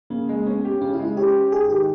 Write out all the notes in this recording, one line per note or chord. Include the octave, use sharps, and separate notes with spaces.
C#3 A#3
G#3
B3 C#4
G4
C#3 C#4
E4
G#3
E4
C#4 G4
G4
G#2 G#4
D#3 G4